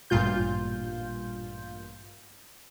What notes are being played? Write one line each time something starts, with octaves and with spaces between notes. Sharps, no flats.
A1 G2 A#2 F4 G6